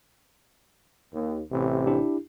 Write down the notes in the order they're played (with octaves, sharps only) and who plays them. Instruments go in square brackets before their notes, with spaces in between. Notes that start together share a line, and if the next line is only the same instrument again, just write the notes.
[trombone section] D#2
A1 C3
[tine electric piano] D4 E4 G4